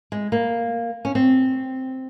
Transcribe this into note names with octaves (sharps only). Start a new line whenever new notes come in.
G#3
A#3
C#4
C4